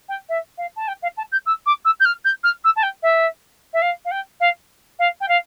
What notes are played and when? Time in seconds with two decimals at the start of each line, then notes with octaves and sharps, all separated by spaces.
0.09 G5
0.29 E5
0.58 F5
0.76 A5
0.88 G5
1.02 F5
1.17 A5
1.32 G6
1.46 E6
1.66 D6
1.85 E6
2.00 G6
2.05 F6
2.25 G6
2.44 F6
2.64 E6
2.76 A5
2.83 G5
3.03 E5
3.73 E5
3.82 F5
4.05 F5
4.11 G5
4.40 F5
4.99 F5
5.20 G5
5.28 F5